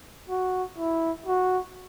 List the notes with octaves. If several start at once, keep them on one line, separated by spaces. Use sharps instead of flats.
F#4
E4
F#4